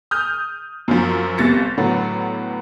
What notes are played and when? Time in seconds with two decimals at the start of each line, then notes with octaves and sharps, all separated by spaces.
0.11 D#6 F6 G6
0.88 F#2 F3
1.37 G1 C3 A6 A#6 C#7
1.77 A2 D3 F#3 B3